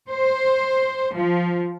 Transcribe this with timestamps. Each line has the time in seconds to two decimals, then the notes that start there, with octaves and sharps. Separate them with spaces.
0.11 C5
1.15 F3